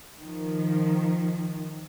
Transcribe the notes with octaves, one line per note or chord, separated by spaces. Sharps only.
D#3 F3